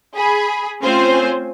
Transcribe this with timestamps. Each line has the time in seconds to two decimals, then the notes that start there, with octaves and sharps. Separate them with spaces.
0.16 G#4 B5
0.82 A3 C4 C#4 F4 C5 G#5